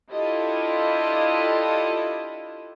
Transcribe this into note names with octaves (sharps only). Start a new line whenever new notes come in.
D4 E4 F4 G4 A4 D#5